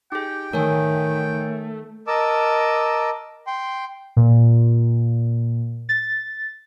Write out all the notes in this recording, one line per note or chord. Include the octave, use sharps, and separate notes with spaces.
D#4 G4 G#4 G5
D#3 A3 A#4 C#5 G#5
A#4 D#5 A5 D6 E6
G5 C6
A#2
A6